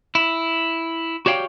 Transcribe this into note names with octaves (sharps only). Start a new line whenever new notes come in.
E4
F#4 G4 C#5 D5 F5 G5